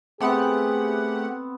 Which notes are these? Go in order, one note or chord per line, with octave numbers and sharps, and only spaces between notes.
A3 B3 C4 G4 G#4 F#5